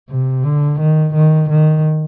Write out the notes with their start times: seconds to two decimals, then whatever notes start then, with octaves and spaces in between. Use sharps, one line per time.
0.09 C3
0.44 D3
0.80 D#3
1.14 D#3
1.49 D#3